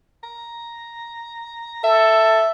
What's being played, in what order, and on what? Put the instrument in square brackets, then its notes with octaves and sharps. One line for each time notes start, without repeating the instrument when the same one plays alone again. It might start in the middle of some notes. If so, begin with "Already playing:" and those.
[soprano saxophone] A#5
[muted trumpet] A4 [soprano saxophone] E5